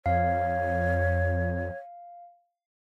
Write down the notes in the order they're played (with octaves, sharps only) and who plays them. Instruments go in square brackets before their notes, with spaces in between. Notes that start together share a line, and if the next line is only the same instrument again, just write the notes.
[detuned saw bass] F2 [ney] C#5 [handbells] F5